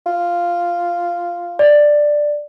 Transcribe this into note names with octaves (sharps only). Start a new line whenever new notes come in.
F4
D5